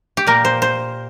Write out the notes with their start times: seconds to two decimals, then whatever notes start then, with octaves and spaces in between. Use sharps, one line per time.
0.17 G4
0.27 A#2 A#3 A#4
0.45 C5
0.62 C5